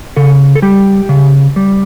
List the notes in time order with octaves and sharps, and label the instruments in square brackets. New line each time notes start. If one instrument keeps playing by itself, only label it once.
[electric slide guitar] C#3 A4
A4
G3 G4
C#3
G3